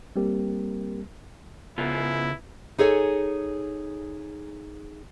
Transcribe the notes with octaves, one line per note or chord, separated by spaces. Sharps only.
G3 A#3 C4 G4 A#4
C#3 B3 E4 F4
D#4 G#4 A4 C#5 G#5